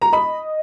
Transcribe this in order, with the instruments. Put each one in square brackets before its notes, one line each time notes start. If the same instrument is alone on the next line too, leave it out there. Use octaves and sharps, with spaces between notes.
[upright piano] A#5
[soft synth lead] D#5 [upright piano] B5